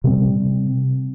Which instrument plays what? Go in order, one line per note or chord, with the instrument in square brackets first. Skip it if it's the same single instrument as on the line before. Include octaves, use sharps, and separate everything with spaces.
[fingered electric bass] C3 G3 C4